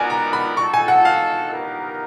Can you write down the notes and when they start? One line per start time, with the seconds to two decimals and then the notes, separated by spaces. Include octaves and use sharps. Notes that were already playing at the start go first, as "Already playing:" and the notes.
Already playing: B3 D#4 F#4 A#4 D5 G#5
0.10 A#5
0.33 B5
0.57 D#4 F#4 A4 C#6
0.74 G#5
0.88 F#5
1.05 F5
1.52 B3 D#4 G4 A#4